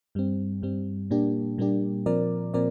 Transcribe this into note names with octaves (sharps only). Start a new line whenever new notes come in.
G2 G3 C4
G2 G3 C4
A#2 G3 A#3 D4 G4
A#2 G3 A#3 D4 G4
A#2 F3 C4 A#4 D5
A#2 F3 C4 A#4 D5